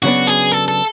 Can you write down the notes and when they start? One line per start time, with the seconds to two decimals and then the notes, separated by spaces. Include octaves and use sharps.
0.02 C#3 F#3 B3 D4 F#4
0.27 G#4
0.52 A4
0.68 A4